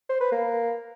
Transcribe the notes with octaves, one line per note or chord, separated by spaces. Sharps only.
C5
B4
A#3